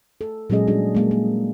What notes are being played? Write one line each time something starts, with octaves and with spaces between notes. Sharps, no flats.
A4
A#2 F#3 G#3 C#4 G#4 D#5
G3 D4 F#4 G#4
G#3 A#3 G#4
A#3